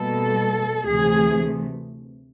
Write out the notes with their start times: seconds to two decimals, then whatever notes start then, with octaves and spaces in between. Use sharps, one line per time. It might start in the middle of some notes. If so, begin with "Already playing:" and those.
Already playing: B2 G3 A#3 A4
0.84 D2 C3 E3 A3 G#4